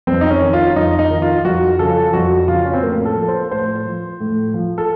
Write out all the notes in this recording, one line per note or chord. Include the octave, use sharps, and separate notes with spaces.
F2 C4
D#4
C#4
D#3
F4
F2 D#4
D#4
D#3
F4
F2 F#4
C#3 F3 A4
F2 F#4
C#3 F3 F4
C#4
C4
A2 A#3
A4
F3
C5
A2 C5
F3
A2
F3
A4